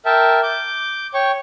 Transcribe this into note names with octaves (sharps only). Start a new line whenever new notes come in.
A#4 E5 G5 A5
D6 G6
C#5 G5 C#6